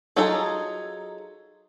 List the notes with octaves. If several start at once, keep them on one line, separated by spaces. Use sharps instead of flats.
F#3 D#4 F4 G#4 A4